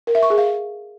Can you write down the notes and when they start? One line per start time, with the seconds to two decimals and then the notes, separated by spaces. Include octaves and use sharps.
0.07 A#4
0.15 E5
0.23 C#6
0.30 G#4
0.38 F5